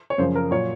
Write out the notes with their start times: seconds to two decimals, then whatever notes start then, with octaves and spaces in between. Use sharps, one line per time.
0.10 C#5
0.18 F#2 C#3 F3 C5
0.35 A#4
0.51 A#2 F#3 C#5